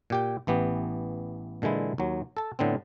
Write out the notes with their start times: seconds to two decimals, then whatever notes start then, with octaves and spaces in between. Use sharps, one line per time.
0.10 A#2 G4 G5
0.47 A1 E3 B3 G4
1.62 A#2 D3 E3 G#3 E4
1.98 D#2 F#3
2.37 A4 A5
2.59 A2 D3 B3 C4